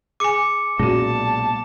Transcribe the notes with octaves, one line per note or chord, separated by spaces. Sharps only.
G#4 G#5 D6 C#7
B1 A#2 G#3 C#4 F#4 A5